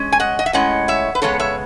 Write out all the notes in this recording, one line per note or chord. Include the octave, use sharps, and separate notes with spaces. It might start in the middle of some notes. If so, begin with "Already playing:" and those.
Already playing: G#3 C#4
G#5
D#5 F#5
D#5
E5
A2 G#3 C#4 D#5 F#5
C#5 E5
B4
C#3 G#3 B3 A4 C#5
C#5 E5